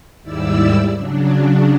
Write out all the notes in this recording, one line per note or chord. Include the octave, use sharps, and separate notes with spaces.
D#2 G#2 G3 E4 D5 E6
C#3 F#3 D4